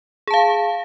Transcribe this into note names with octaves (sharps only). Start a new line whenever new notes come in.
G#4 F5 A5